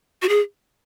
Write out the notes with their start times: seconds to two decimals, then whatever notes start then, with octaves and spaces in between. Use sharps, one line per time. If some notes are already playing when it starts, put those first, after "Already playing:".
0.22 F#4
0.29 G#4